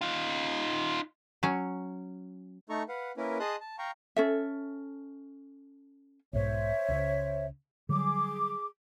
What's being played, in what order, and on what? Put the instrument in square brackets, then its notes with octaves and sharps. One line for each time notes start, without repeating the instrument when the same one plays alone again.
[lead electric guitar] D#4 F4
[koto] F#3 C#4
[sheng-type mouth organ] A3 D#4 A4 A#5 C#6
B4 F5 F#5
A#3 C#4 E4 A#4 B4
G#4 D#5 A5 C6 D#6 F#6
A5
F5 G5 A#5 C#6
[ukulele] C#4 A4 E5
[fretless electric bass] B1 G#2 B2 [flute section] C5 C#5 E5
[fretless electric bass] C#2 C#3
[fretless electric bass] D3 F#3 G3 [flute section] G#4 D6